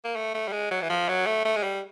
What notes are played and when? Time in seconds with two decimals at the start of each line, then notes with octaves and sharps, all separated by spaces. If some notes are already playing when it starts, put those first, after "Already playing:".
0.04 A#3
0.16 A3
0.34 A3
0.48 G3
0.52 G#3
0.71 F#3
0.82 E3
0.90 F3
1.09 F#3
1.26 A3
1.45 A3
1.56 G#3
1.63 G3